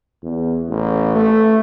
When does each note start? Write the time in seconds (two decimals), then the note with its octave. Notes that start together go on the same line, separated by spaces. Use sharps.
0.23 E2
0.69 A1
1.16 A3